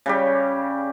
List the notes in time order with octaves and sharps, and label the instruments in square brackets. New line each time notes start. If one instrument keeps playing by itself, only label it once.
[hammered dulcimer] C#3 G3 G4